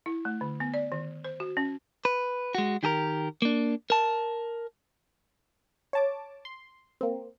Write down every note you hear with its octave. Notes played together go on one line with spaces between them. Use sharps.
E4
A3
D3
B3
D5
D#3
C5
F#4
C#4
B4
G#3 F#4
D#3 G4 G#4 A#4
A#3 D4
A#4 A5
C#5 A5 D6
C6
A#3 C4